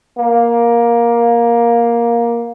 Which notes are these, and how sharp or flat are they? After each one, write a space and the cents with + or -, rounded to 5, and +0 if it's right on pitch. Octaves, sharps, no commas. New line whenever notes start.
A#3 +10